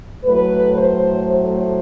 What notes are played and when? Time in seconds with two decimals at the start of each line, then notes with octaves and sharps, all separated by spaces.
0.24 A2 F#3 A3 B4
0.77 C5
1.29 C5